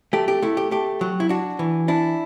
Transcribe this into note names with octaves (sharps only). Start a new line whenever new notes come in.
A3 G4
G4
A3 E4
G4
A3 G4
F#3
E4
D4 F#4
E3
D4 E4